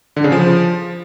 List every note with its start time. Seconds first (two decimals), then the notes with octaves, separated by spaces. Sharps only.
0.16 D3
0.24 C#3
0.32 F3